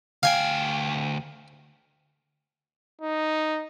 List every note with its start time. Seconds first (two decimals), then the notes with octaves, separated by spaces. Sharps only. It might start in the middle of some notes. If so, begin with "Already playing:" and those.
0.23 D2 F5 G5 G#5
3.01 D#4